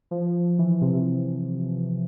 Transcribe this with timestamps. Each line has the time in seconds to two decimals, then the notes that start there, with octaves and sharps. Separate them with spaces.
0.11 F3
0.59 E3
0.81 C3